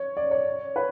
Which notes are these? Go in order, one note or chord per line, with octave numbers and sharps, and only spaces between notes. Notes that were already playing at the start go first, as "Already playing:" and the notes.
Already playing: C#5
D5
C#5
B4